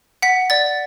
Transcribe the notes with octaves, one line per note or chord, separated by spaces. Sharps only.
F#5 B6
D5 A6